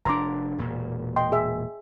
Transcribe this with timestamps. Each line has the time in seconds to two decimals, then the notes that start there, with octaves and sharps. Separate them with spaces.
0.05 F1 D4 A#5 C6 D6
0.58 E1 A#2
1.16 D#5 G5 C6
1.32 G#4 E5